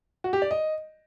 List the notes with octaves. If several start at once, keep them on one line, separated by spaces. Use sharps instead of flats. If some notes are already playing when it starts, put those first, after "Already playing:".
F#4
G4
D5
D#5